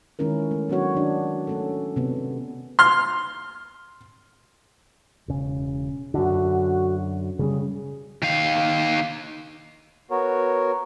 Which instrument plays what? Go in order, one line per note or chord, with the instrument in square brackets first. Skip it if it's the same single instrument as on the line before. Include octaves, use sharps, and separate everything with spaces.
[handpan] D#3 G#3 C#4 E4 A#4
A3
F#3 B3 C#4 D4 F#4 C#5
D#3 D4
A3 C#4 A4
C3 B3
[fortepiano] C6 F6
[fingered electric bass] E1 C#3
[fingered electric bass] F#2 D3 [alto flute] F#4
[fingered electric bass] C#3 G3 C#4 [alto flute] G#4
[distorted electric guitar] D#3 F5
[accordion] B3 F#4 A#4 C#5